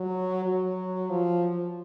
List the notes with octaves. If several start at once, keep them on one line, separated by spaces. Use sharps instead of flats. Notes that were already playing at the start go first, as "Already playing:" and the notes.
Already playing: F#3
F#3
F3